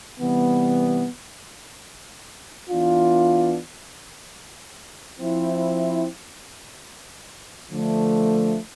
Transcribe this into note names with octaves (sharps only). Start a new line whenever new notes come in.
C3 E3 G3 B3
E3 B3 D4 F4
F3 C4 E4
D3 F3 A3 D4